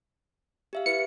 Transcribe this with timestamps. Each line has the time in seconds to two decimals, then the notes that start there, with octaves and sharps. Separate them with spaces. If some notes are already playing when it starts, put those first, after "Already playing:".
0.73 G4 E5 F5
0.86 E4 B4 C#7